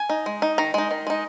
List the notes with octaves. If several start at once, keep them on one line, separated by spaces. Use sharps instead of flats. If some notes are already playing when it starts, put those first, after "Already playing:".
Already playing: G#5
D#4
G#3
D#4
D#3 A#5
G#3 D#4
D#3
G#3 D#4